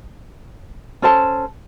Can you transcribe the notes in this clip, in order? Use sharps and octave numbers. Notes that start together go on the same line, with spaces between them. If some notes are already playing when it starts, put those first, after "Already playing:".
C#4 A4 C5 A5